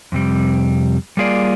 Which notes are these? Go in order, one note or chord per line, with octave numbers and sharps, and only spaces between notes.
F2 C3 G3
G3 A#3 F4 G#4 D5